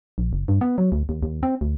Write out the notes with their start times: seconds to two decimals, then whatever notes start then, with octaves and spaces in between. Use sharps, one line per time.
0.18 A#1
0.33 F#1
0.48 G2
0.61 B3
0.78 F#3
0.92 D2
1.09 D#2
1.23 D#2
1.43 C4
1.61 D2